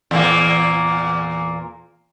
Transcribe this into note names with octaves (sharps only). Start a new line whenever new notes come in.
E2 A#2 A#3